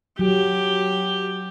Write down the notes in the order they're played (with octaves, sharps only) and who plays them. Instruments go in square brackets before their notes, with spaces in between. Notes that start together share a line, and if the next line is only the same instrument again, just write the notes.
[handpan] F#3 [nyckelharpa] G4